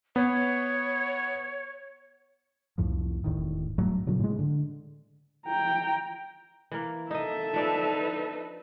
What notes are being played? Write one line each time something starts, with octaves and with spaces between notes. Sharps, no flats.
B3 C#5
C2 F2 A2 F3
E1 A2 D#3
A2 F#3 G3 A3
A#2 C#3 F#3 G3
A2 G#3
D3
G5 A#5
E3 A#3
D#4 A4 D#5 E5
F3 D4 D#4 B4 D5